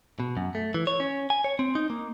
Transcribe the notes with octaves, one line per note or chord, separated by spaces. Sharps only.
B2
F#2
A3
E3
C#5
C#4
G#5
C#5
C4
D#4
A#3